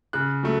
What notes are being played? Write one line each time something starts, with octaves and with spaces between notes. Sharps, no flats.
C#3 F#6
F#3 A3